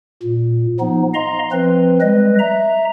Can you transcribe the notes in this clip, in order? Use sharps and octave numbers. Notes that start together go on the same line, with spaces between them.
A#2
F3 B3 D#4
D#5 F5 A#5 C6
F3 C4 B4
G3 G#3 B4 D#5
E5 A#5